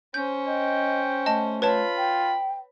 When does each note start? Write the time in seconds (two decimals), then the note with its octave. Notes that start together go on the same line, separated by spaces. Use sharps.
0.14 C#4 C5 G6
0.46 D#5 G5
1.26 A3 D#5 A5
1.62 F4 B4 C#5 A5 B5
1.97 G5